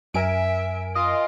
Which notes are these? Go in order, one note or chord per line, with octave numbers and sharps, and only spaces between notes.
F#2 A#4 E5 G#5 D7
F4 D#5